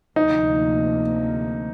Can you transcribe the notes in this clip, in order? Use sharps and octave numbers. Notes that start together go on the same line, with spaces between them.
D2 C3 F3 A#3 D#4